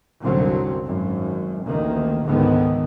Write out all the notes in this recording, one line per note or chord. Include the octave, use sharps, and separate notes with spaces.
C2 F#2 A#2 D3 F#3 C4
G#1 F#2
A1 D2 D#3 A#3
C#2 G#2 D3 D#3 B3